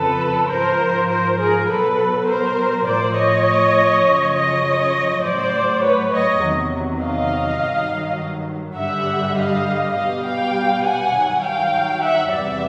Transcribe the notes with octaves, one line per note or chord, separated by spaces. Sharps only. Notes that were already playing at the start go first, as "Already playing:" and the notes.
Already playing: F2 C#3 F3 A4 B4
G#2 F3 A#4 C5
A#4 C5
G#4 A#4
B2 F#3 A4 B4
A#4 C5
A2 F3 C5 D5
C#5 D#5
F#2 C#3 F3
C#5 D#5
A2 F#3 C5 D5
B4 C#5
C#5 D#5
E2 C3 D#3 F#3
D#5 F5
G2 D#3 F#3
G2 D3 G3 E5 F#5
D#5 F5
B2 G3 D#5 F5
F5 G5
F#5 G#5
G2 D#3 F#3
F5 G5
E5 F#5
E2 C3 E3 G3 D5 E5